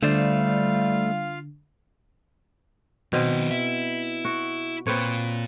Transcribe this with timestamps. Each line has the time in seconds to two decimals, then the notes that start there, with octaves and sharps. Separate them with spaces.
0.03 D3 G3 A3 F4 C5 D5 F5
3.13 B2 D#3 C4 B4
3.51 E4
4.25 F#4
4.87 A#2 C4 B4 C#5